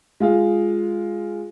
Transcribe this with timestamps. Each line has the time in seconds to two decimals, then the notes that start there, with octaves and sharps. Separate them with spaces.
0.20 G#3 F4 G#4 F5